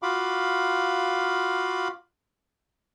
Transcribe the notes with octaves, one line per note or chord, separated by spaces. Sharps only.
F4 F#4 F5 B5 D6